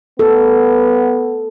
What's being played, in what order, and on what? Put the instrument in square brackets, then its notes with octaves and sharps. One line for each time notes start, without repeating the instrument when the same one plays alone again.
[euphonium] B3 [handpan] A4